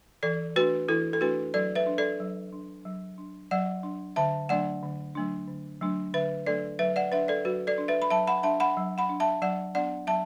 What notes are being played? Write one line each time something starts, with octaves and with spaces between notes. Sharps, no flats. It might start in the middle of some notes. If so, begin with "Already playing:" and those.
E3 A4 D5
A3 D4 F#4 B4
E3 E4 A4
A4
A3 D4 F#4 B4
F#3 A4 D5
B4 E5
D4
A4 D5
F#3
D4
F#3
D4
F#3 D5 F#5
D4
D3 E5 A5
F#3 A3 D4 D5 F#5
D3
F#3 A3 D4
D3
F#3 A3 D4
D3 B4 E5
F#3 A3 D4 A4 D5
F#3 B4 E5
D5 F#5
D4 B4 E5
A4 D5
F#3 F#4 B4
A4 D5
D4
B4 E5
B5
F#3 E5 A5
F#5 B5
D4 E5 A5
F#5 B5
F#3
F#5 B5
D4
E5 A5
F#3 D5 F#5
B3 D4 D5 F#5
F#3 E5 A5